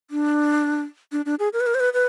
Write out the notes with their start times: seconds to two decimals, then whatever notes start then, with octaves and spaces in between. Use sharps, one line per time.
0.11 D4
1.12 D4
1.26 D4
1.39 G#4
1.53 A#4
1.60 B4
1.67 A#4
1.75 C5
1.80 B4
1.93 B4